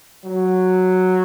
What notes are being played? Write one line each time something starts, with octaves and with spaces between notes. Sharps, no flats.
F#3